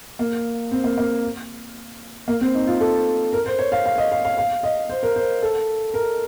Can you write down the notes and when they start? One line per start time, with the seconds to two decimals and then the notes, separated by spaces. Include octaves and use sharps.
0.19 A#3
0.71 C4
0.84 A#3
0.98 A#3
2.28 A#3
2.41 C4
2.54 D#4
2.67 F4
2.80 A4
3.33 A#4
3.46 C5
3.59 C#5
3.72 F5
3.86 F5
3.98 D#5
4.12 F5
4.25 F5
4.38 F5
4.63 D#5
4.89 C5
5.03 A#4
5.16 C5
5.43 A4
5.94 A#4